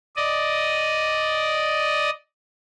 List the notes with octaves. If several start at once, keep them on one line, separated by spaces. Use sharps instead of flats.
D5 D#5